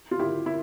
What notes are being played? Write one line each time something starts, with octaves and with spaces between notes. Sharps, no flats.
F4
E4 G4
E4